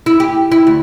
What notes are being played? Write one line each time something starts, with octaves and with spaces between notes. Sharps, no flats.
E4
G4
E4
D2